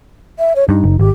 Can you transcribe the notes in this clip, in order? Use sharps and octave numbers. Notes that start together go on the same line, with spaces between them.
E5
C#5
G2 D#4
F#1
G#1 G4